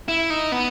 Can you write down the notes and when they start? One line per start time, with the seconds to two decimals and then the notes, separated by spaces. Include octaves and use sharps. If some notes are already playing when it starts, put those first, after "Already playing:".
0.08 E4
0.30 D#4
0.52 B3